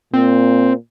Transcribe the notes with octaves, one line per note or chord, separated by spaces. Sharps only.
A#2 C4